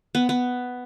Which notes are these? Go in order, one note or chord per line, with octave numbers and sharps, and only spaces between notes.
B3
B3